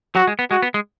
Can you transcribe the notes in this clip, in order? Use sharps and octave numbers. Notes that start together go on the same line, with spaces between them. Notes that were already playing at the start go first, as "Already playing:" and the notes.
F#3 F#4
G#3
B3
G#3 F#4
B3
G#3